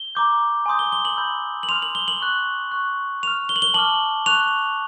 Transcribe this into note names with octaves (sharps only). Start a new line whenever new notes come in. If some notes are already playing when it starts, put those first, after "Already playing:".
Already playing: G7
A#5 D6 G6
G#5 C6 D#6 G6
G7
G7
F#7
B5 E6 G6
F#7
C6 F6 F7
F#7
G7
F#7
C#6 F#6
C#6 F#6
C#6 F6 F7
G7
F#7
G7
A5 D6 F6 F#7
C#6 F#6 F7